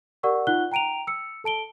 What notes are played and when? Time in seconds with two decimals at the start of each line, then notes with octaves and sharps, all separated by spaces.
0.23 G4 A#4 D5 F#5 C#6 E6
0.47 D#4 F4 F#5 F#6 G7
0.72 G5 A#5 D7 D#7 F7
1.07 E6 C#7
1.44 A4 A5 D7 G7